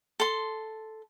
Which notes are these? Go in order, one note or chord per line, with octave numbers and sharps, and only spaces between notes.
A4 C6